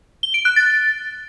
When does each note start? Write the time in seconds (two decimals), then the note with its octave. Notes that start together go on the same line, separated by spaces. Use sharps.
0.23 G7
0.34 D7
0.45 F#6
0.56 A6